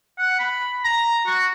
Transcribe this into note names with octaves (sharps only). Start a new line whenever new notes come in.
F#5
B5
A#5
F#4